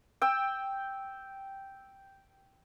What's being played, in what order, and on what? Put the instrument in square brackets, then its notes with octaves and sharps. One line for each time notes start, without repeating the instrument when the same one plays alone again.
[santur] G5 E6